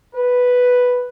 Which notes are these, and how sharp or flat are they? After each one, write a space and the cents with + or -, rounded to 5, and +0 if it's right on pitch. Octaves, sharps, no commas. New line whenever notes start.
B4 +0